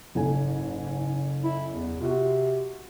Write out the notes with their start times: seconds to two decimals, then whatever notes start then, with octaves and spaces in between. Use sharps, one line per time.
0.15 F#1 G#2 A4 G#5
1.44 E4
1.72 E2
2.00 C3 F4 F#4